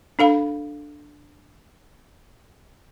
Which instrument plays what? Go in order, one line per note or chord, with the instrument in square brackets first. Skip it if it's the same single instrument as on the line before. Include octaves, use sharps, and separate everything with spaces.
[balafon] D4 A4 F5 B5